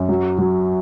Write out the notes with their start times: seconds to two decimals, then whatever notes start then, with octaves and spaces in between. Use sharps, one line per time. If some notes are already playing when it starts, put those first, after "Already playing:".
Already playing: F#2
0.09 F#3
0.38 F#3